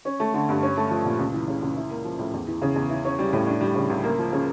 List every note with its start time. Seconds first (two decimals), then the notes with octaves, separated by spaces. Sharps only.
0.05 C#4
0.20 A3
0.34 D3
0.49 G2
0.63 C#4
0.77 A3
0.91 F3
1.05 A#2
1.19 C#2
1.33 E3
1.48 C#3
1.62 C#2
1.77 E4
1.90 A#3
2.04 F3
2.19 A2
2.33 E2
2.47 E3
2.62 C#3
2.75 E2
2.90 E4
3.05 C#4
3.19 G3
3.33 A2
3.47 D4
3.61 G3
3.75 C#3
3.90 C#2
4.04 A#3
4.19 F3
4.33 C#3